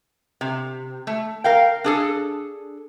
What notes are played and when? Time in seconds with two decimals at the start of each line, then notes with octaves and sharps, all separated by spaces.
0.41 C3
1.07 A3
1.44 A#4 F5 G5
1.84 D4 G#4 A4